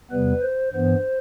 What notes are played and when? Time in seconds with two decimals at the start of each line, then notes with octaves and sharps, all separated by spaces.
0.11 E2 C3 G3 B3 B4
0.42 C5
0.73 G2 E3 B3 C5